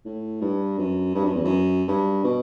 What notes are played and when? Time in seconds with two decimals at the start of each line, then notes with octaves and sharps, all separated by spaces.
0.05 A2
0.41 G2
0.78 F#2
1.15 G2
1.25 F#2
1.35 E2
1.44 F#2
1.88 G2
2.24 B2